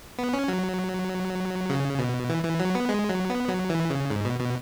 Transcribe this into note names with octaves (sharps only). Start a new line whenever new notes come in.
B3
C#4
F#3
C#3
B2
E3
E3
F#3
B3
G#3
F#3
B3
F#3
E3
C#3
G#2
B2
B2